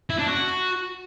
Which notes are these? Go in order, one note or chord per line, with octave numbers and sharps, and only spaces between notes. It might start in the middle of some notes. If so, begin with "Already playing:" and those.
E4
D4
F#4